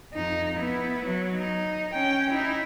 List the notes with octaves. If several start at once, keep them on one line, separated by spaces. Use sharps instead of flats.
F2 D#4
B3 E4
F#3
D#4
C#4 G5
D#4 E4